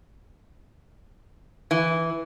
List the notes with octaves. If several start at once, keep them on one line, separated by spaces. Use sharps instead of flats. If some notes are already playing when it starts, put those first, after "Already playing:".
E3